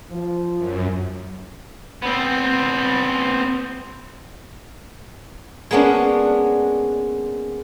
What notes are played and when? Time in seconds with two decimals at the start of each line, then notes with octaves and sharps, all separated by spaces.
0.11 F3
0.57 F#2
2.02 B3 C4
5.71 G#3 A#3 B3 C#4 D4